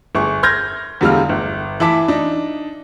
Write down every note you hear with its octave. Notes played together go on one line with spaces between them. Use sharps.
G1 G#4 C#6
C6 F6 G6 G#6 A#6
E2 D3 G3 G#3 F5 F6
G1
E3 E4 E5 A5 D6 B6
D4 D#4